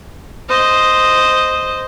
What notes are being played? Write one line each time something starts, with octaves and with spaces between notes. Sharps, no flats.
C5 D#5